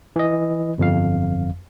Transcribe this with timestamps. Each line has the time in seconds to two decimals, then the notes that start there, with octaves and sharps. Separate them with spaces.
0.16 E3 D#5
0.78 G1 F2 F5